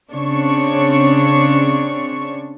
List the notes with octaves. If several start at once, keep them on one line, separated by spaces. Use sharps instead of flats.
C#3 C4 D4 C#5 C#6